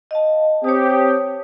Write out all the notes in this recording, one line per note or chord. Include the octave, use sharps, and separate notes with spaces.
D#5 F5 A5
C4 G4 C#5 A5 D#6